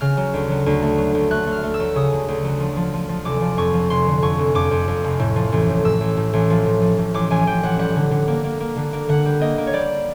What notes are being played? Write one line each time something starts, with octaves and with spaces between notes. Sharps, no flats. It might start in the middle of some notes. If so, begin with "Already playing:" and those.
C#3 F6
F#3
D2
F#3
D2
A3
F#3
D2
A3 F#6
A3
F6
A3
E6
F#3
C#3 D#6
D2
D2
F#3
F3
F3
F3
F3
F1 D6
F3
F2 C#6
F3
F1 C6
D3
F2 C#6
F1
F2 D6
F2
F2
F1
A2
F3
A1
A2
A2 E6
A1
A2
A1
F3
A2
F3
A2
A1 D6
A1 G#5
A1 G5
A1 F#5
G3 F#5
D3
D3
A#3
A#3
A#3
D3
A#3
D3 F#5
G3
A#3 D#5
A#3
C#5
G3 D5